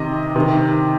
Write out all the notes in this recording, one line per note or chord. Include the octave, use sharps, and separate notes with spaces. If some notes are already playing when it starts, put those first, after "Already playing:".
Already playing: C3 D#3 D#5
C3 D#3